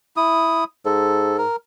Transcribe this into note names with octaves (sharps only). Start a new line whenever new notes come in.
E4 D#6
G#2 A4
A#4